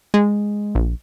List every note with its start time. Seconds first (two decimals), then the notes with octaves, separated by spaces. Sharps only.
0.14 G#3
0.75 A#1